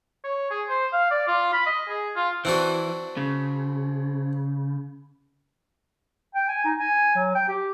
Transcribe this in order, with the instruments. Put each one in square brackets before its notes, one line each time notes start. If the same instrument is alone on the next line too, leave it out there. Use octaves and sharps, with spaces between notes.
[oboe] C#5
G#4
C5
F5
D5
F4
B5
D#5
G#4
F4
[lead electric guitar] E3 [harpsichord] C4 D4 F#4
[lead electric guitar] C#3
[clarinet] G5
G#5
D#4
G#5
F#3
G5
G4